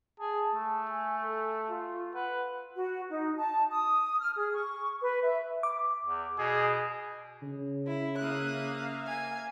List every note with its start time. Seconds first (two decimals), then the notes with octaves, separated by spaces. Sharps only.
0.20 G#4 A5
0.55 A3
0.90 G#5
1.24 A4
1.69 F4
2.15 B4 F#5
2.75 F#4
3.09 D#4
3.38 A5
3.72 D#6
4.19 F6
4.37 G#4
4.53 C#6
5.02 B4
5.23 E5
5.63 D6
6.05 E2
6.38 B2 G#4
7.42 C#3
7.87 E4
8.19 A#3 E5 F5 D#6 F#6
9.07 G#5